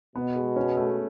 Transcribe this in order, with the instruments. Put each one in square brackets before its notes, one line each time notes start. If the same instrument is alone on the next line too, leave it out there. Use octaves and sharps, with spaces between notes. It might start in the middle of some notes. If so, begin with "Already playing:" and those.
[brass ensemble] B2 [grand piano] B3
[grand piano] G#3
C#4
A3